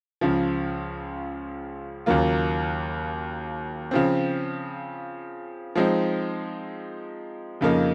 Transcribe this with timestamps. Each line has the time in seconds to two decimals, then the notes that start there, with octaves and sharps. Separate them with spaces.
0.21 C#2 C#3 F3
2.06 D#2 C#3 F#3 A#3 F4
3.91 C#3 F3 C4
5.76 F3 G#3 C4 D#4
7.61 F2 C#3 F3 A#3 D#4